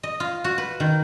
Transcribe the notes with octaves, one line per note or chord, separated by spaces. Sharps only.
D#5
F4
F#4
B4
D#3